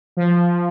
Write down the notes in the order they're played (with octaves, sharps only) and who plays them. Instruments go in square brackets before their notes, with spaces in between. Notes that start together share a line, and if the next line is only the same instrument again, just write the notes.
[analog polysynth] F3